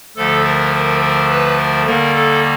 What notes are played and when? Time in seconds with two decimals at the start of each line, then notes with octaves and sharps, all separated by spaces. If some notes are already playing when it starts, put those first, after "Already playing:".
0.16 D2 D3 F3 A3 A4
0.45 A#4
0.73 A#4
1.01 A#4
1.30 B4
1.58 A#4
1.86 D#2 D3 G3 A#3 A#4
2.14 A4